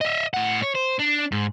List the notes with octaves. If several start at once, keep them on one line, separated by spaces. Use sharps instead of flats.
D#5 E5
A2 F#5
C#5
C5
D4
G#2